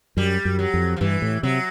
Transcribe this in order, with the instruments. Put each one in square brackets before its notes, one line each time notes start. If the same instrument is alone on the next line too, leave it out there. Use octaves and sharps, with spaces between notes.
[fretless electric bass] F#2 [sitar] G3
[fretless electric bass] F#2
[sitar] F#3
[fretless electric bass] F2
[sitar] F3
[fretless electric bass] G2 [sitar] E3
[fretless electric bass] A2
[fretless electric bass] C3 [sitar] F#3